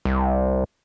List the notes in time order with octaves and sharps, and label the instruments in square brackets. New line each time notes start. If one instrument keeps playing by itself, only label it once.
[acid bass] C2